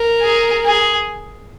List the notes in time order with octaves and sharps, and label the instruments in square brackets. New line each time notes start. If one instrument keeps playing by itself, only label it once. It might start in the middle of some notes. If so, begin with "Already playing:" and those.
Already playing: [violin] A#4
[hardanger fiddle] G#4
G#4